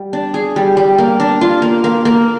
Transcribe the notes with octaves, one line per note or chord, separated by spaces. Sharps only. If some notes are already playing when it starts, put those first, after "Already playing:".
Already playing: G3
D4
G#4
G3
G3
A#3
D4
F4
A#3
A#3
A#3